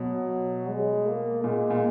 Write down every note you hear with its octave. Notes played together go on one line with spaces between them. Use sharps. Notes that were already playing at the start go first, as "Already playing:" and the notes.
Already playing: B2 F#3
G#3
A#3
A#2 G#3
A#2